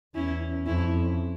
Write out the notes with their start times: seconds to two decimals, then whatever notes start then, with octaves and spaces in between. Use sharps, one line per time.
0.15 E2 C#4 E4
0.66 F2 C#4 E4